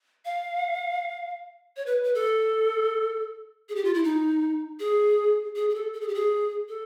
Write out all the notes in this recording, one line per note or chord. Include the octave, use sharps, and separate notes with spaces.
F5
C#5
B4
B4
A4
G#4
G4
F4
E4
D#4
G#4
G#4
G#4
A4
A4
G#4
G4
G#4
A4